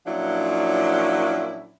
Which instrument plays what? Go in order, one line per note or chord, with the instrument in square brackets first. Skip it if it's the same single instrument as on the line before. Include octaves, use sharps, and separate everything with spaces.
[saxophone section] A#2 F3 F#3 C#4 D4 E4